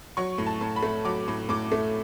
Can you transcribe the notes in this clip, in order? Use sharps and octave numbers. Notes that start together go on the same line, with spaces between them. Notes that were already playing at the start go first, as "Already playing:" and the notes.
F#3 C#6
A2
A5
A2
B5
A3
F#3 D6
A2
A2 D6
A3